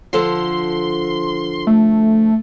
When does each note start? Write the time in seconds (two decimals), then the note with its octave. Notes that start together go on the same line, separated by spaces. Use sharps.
0.13 D3 F3 A4 C6
1.67 A3